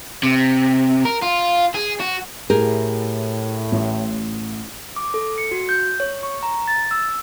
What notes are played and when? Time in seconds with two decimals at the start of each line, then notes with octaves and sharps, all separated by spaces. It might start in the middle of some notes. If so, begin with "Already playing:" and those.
0.23 C3
1.05 A#4
1.22 F4
1.74 G#4
2.00 F#4
2.50 A2 G4 G#4 A#4
3.72 A1
4.96 D6
5.14 A4
5.38 C#7
5.51 F#4
5.69 G6
6.00 C#5
6.23 C#6
6.43 A#5
6.68 A6
6.91 E6